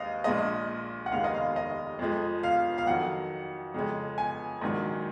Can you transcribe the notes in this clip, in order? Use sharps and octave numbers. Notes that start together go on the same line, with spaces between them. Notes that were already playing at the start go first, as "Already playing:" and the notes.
Already playing: D#2 G#3 D#5 F5
A#1 A#2 G#3 D#5
F#5
F1 D#2 D#3 G#3 F5
D#5
F5
D#5
F2 F3 G#3
F5
F5
F2 D#3 F#3 F#5
F2 C#3 G#3
G#5
A#1 G#2 D#3 F#3